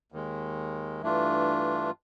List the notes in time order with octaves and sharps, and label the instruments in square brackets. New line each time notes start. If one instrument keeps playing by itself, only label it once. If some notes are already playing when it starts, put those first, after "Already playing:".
[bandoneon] D#2 D#3 G#3
G2 E3 A3 D4 F4